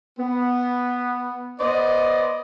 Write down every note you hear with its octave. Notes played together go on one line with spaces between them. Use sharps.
B3
B3 C5 D5 D#5